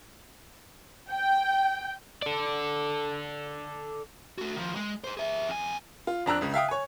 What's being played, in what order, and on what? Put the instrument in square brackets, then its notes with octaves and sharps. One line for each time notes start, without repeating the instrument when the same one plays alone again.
[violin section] G5
[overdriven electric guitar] A4 D5
[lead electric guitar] A3 F#4
D#3 F3
G#3
G#4 C5
G#4 E5
F2 G#5
[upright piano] F4
F2 D4 A#5 E6 F#6
C#2 C#3
E5 F5 G5 D#6
C#5 G#5